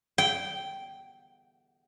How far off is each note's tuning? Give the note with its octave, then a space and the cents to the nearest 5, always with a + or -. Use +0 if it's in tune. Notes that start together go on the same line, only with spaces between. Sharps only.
G5 -10